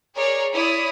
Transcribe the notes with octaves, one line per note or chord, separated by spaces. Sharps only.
G#4 A#4 C#5 D5
E4 C#5 D5 D#6